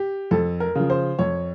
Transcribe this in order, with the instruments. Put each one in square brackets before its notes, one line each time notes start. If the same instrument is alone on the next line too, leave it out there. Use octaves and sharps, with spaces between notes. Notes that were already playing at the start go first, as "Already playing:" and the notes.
Already playing: [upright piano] G4
F2 A4
A#4
C#3 F3
C5
F2 C#5